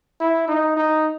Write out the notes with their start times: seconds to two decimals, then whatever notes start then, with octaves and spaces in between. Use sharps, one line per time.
0.21 E4
0.48 D#4
0.77 D#4